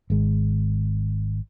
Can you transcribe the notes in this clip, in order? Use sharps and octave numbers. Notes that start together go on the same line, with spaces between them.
G#1 G#3